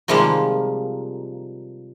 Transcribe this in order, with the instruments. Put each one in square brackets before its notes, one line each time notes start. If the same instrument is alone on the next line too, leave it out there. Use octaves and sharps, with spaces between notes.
[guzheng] C3 D#3 F3 G3 G#3 A#3